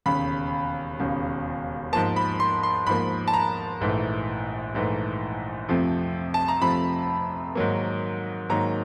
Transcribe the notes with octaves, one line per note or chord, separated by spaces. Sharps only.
E1 D#2 C#3 B5
E1 D#2 C#3
G#2 F3 A#3 A5
B5
C6
C6
G#2 F3 A#3 B5
A5
A#5
A#1 G#2 E3 A3
A#1 G#2 E3 A3
F2 C3 F3 A3
A5
A#5
F2 C3 F3 A3 B5
G#2 D#3 F#3 A#3
G#2 D#3 F#3 A#3 A#5